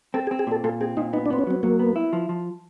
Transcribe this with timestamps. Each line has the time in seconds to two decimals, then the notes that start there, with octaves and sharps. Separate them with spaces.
0.14 C4 A4
0.27 G#4
0.31 C4
0.39 G#4
0.47 A#2 A4
0.64 A#2 A4
0.81 C4 G#4
0.97 A#2 D#4
1.13 B3 D#4
1.26 D4
1.30 B3 C4
1.39 C#4
1.47 F#3 C4
1.63 F#3 A#3
1.79 B3
1.96 E4
2.13 F3
2.29 F3